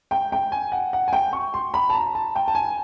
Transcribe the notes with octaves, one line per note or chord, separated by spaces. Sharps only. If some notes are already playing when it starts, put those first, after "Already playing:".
G5
G5
G#5
F#5
F#5
G#5
G5
C#6
C6
B5
A5
A#5
A5
G5
A5
G#5